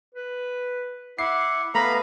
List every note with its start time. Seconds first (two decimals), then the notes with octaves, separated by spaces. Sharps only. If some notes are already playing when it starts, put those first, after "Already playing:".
0.15 B4
1.19 E4 E5 F#5 D6 C7
1.75 A3 B3 B4 F5 A#5 B5